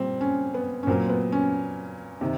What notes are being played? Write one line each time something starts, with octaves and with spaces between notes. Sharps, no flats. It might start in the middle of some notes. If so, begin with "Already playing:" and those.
Already playing: A#2 G3 C4
C#4
B3
C#4
A#2 F#3 A#3 C4
B3
C#4
C3 D#3